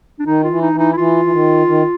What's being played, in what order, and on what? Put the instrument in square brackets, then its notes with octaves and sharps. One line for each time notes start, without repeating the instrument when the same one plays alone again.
[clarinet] D4
[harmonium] D#3 [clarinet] D#4
[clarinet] F4
[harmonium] E3
[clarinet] D#4
[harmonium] E3
[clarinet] D#4
E4
[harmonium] E3 [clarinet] F4
[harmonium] E3
D#3
D#3